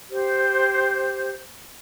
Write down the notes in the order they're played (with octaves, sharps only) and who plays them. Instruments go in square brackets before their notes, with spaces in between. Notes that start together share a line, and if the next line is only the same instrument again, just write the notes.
[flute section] G4 C5